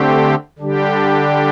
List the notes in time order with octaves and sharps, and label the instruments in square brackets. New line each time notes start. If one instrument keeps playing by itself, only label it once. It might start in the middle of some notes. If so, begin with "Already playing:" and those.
Already playing: [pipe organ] D3 A3 C4 G4
D3 G3 D4 G4